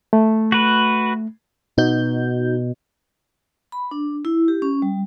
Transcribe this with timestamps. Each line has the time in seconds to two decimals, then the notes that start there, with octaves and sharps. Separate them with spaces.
0.13 A3
0.52 F#4 B4
1.78 B2 D#4 F#4 G6
3.72 B5
3.91 D4
4.25 E4
4.48 G4
4.62 C#4
4.82 G3